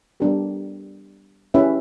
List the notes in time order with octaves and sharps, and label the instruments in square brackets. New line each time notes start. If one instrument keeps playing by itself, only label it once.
[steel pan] G3 B3 D4 G4 A#4
C#4 E4 G4 B4 E5